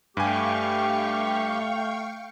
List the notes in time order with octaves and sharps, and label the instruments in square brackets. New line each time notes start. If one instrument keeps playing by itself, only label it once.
[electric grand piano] G2 G#5 [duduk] A3 [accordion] G4 [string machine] F5 G5 C#6